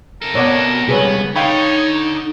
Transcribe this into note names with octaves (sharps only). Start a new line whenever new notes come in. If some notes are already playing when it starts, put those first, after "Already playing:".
C3 A4 A#4
B2 C#5 D5 F#5
C#2 G3 B3 G#4 B4 C#5
D3 D#4 C#5 F5 G5 B5